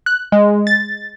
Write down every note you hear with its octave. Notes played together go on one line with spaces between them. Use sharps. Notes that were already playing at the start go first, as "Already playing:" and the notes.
F#6
G#3
A6